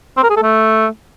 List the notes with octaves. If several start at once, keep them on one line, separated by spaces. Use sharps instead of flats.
C4
A#4
G#4
A4
A3